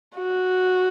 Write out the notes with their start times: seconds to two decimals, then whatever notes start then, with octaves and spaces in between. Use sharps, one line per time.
0.17 F#4